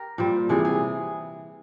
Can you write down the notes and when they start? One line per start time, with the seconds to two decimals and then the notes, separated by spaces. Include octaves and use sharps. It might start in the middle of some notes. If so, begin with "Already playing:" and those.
Already playing: G4 A#4
0.18 A#2 G3 C5
0.49 C3 E3 G3 G#4
0.65 G#4